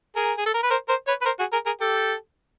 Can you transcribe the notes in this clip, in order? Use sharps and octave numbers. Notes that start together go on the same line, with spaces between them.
G#4 A#4
G#4
A4
A#4
B4
A#4 C5
A#4 C5
B4 C#5
B4
A#4 C5
F#4 G#4
G#4 A#4
G#4 A#4
G4 A4